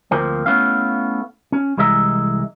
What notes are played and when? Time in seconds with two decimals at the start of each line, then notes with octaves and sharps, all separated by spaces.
0.11 D2 F3 A#3 C4
0.46 A3 B3 C#4 E4 F5
1.52 C#4
1.77 C2 E3 G#3 D#5 E5 A#5